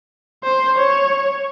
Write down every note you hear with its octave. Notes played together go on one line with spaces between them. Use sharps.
C5
C#5